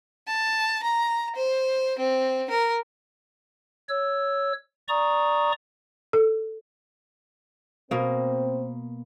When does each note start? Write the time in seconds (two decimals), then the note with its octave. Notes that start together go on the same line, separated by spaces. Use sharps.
0.28 A5
0.83 A#5
1.36 C5
1.99 C4
2.50 A#4
3.89 C#5 E6
4.88 D5 A#5 C#6 D#6
6.13 A4
7.91 B2 A#3 C4 C5